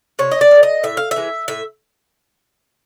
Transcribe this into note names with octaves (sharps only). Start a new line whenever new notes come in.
C3 C#5
D#5
D5
F3 A3
D#5
A2 E5
F5
E5
E3 G#3
A2 E5